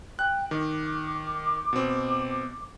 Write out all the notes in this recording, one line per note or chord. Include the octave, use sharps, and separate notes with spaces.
G5 F#6
D#3 D6
B2 C4